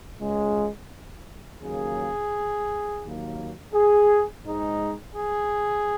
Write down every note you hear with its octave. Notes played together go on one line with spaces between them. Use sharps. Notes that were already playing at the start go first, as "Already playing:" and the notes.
C#2 C#3 G#3
D#2 C#3 F#3 A#3 G#4
D#2 D#3 F#3 A#3
G#4
G#2 G#3 D#4
G#4